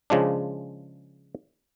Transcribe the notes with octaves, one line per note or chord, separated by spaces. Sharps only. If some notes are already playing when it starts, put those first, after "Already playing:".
C#3 F3 G#3 D4